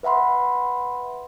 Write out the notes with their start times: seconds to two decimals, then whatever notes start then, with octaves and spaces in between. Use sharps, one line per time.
0.03 B4 E5 F#5 B5 C6